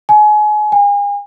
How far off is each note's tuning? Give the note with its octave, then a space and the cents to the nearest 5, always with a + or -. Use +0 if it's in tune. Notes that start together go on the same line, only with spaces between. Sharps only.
G#5 +30
G#5 -40